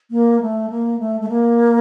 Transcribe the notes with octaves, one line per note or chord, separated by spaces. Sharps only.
A#3
A3
A#3
A3
A3
A#3